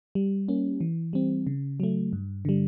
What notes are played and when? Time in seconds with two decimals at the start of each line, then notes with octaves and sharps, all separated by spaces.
0.15 G3
0.48 A#3 C#4
0.81 E3
1.13 G3 C4
1.47 C#3
1.80 F#3 A3
2.13 G2
2.45 D3 G3